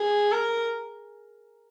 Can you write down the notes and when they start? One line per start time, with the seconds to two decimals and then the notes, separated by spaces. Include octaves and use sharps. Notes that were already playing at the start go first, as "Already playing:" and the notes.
Already playing: G#4
0.31 A#4